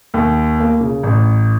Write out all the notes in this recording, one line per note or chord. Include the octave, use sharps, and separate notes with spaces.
D#2
A#3
C#3
A1